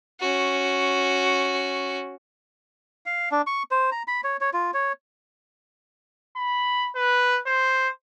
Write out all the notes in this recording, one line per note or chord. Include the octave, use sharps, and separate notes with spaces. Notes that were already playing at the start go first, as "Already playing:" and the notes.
C#4 F#4
F5
D4
C#6
C5
A#5
B5
C#5
C#5
F4
C#5
B5
B4
C5